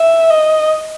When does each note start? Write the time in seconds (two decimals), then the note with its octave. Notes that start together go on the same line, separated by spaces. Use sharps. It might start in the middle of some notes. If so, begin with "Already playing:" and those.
Already playing: E5
0.30 D#5